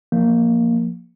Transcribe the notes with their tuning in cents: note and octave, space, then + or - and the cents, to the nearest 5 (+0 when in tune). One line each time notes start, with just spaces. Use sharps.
F3 +0 A#3 +0